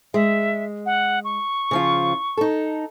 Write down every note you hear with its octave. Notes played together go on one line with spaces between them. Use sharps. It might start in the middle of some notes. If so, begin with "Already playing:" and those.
G#3 E5
F#5
C#6
C#3 F3 F4
D#4 A4